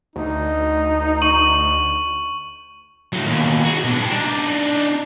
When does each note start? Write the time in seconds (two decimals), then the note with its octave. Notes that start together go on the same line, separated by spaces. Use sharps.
0.16 D2 D#4
1.22 C#6 D#7 F#7
3.13 A2 F#3
3.26 D#2 B2
3.65 F#4 G#4
3.84 B2 D4
3.98 G2
4.10 D4 D#4